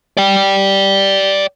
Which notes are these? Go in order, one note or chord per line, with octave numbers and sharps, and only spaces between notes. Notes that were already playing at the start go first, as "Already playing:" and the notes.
D5 G5